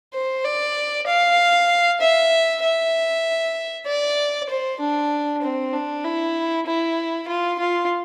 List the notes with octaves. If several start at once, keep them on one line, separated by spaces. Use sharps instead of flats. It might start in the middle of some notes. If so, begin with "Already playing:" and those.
C5
D5
F5
E5
E5
D5
C5
D4
C4
D4
E4
E4
F4
F4